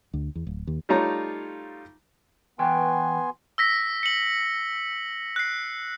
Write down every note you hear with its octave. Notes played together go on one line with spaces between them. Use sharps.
D2
E2
D1
D#2
G3 A3 D#4 F4 C#5 A#5
E3 B3 B4 G5 G#5 C6
E6 A#6 B6
C#7 F#7
F#6 C7